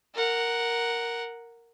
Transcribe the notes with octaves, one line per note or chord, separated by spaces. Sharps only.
A#4 F#5